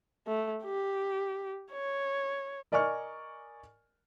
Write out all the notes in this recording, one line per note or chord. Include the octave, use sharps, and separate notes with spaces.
A3
G4
C#5
A#4 D5 D#5 G#5 C#6 F6